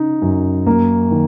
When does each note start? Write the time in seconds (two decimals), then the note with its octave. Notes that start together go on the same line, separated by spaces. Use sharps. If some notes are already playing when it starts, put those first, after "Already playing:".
Already playing: C#3 D#4
0.22 F#2
0.66 A#3
1.11 D#3